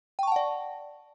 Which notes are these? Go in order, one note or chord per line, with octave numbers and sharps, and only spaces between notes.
D5 F#5 G5 A5 C#6